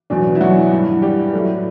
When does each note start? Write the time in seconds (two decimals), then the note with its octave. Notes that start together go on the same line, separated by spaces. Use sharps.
0.10 E2 B2 F#3 D4
0.35 E4
0.41 F#3 F#4
0.71 G2 E3 G3
1.02 G3 G4
1.33 A2 F#3 A3